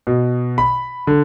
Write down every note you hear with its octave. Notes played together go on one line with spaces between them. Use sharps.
B2
B5
D3